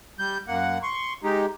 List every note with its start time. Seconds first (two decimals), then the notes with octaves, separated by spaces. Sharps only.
0.19 G3 G6
0.48 F#2 A#3 F#5
0.83 C6 C#6
1.23 G#3 D#4 G4